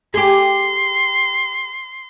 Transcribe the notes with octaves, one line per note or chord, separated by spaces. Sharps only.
G4 G#4 C6